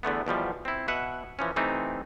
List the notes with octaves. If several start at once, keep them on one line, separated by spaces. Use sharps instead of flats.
E2 D3 A3 B3
E2 B2 F3 G3
C4 E4
B2 B4 E5 F#5
E3 F3 C#4
C3 E3 A3 C4 D#4